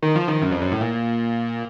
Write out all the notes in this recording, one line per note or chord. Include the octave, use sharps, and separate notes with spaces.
D#3
F3
D#3
F#2
F2
F#2
A2
A#2